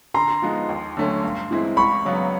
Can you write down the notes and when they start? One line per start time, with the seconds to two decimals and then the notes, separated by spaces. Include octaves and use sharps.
0.14 D3 A#5 C6
0.42 F3 G#3 B3 D#4
0.69 D#2
0.97 D3 F#3 A3 C#4
1.23 G2
1.51 E3 G#3 C4 E4
1.77 C#2 B5 C#6
2.05 C#3 F#3 B3